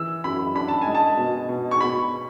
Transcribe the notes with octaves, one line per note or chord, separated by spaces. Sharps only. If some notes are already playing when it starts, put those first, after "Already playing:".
Already playing: E3 E6
F#2 B5
D4 B5
A5
G#5
G#3
A5
B2
B2
C#6
B2 B5